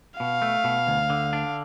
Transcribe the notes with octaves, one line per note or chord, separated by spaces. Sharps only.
B2 F5
A3
B2
D2
D3
D4